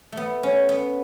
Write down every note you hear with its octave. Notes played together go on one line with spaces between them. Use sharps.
A3 B3
C#4
B3